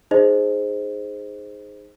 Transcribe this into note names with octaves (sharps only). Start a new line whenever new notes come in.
D#4 G#4 C5 D#5